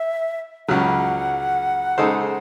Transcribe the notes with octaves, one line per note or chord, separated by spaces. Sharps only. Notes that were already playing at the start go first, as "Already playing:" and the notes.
Already playing: E5
C#2 C#3 F#3 F#5
C#3 G#3 D#4 A4 C5